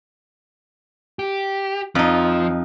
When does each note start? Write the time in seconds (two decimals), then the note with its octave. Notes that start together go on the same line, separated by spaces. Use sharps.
1.19 G4
1.95 F2 F3 D#4